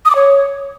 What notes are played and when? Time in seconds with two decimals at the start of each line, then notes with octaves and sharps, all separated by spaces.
0.05 D#6
0.10 D6
0.15 C#5